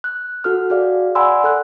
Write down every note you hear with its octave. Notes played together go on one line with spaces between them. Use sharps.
F#6
F#4 A4 F6
F#4 G#4 D5 F5
D5 F#5 G#5 B5 C6 E6
A4 F#6